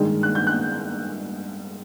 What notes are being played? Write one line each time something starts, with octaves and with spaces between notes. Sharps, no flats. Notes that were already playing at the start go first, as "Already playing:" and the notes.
Already playing: G2 D#3 G#3
F#6
G6
F#6